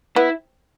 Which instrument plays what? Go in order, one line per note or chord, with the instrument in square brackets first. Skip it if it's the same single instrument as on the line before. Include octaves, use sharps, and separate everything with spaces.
[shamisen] B3 [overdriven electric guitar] E4